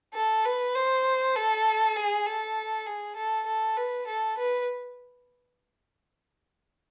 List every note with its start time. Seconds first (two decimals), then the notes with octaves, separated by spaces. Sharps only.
0.14 A4
0.45 B4
0.75 C5
1.36 A4
1.96 G#4
2.26 A4
2.86 G#4
3.16 A4
3.46 A4
3.77 B4
4.07 A4
4.38 B4